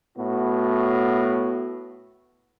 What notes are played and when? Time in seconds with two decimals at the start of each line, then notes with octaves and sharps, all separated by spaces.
0.17 A2 B3 F#4